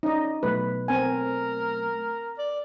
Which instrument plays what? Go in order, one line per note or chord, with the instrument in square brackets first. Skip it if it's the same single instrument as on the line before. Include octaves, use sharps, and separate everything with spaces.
[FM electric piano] C#4 D5 [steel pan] D#4 D#5
[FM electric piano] B2 F#3 A3 [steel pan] B4
[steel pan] C4 G#5 [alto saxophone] A#4
[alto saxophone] D5